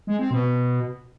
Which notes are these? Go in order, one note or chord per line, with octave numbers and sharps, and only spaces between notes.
G#3
C4
B2